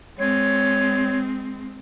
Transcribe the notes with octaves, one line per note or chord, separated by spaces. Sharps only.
G#3 C4 C#5